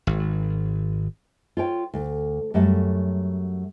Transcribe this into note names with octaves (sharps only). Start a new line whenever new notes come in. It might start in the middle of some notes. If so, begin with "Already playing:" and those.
G#1
F4 C#5 G5
D2
F#2 F#3 G3 A3 F#5